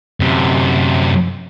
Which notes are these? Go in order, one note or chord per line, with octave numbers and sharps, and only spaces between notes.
F#2 C3